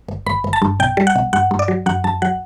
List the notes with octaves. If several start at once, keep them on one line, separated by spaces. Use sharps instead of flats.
G1
G1 B5
G1
A5
G2
B1 G5
G3
F#5
B1
G2 F#5
G2
D5
F#3
F#2 F#5
F#2 A5
F#3 F#5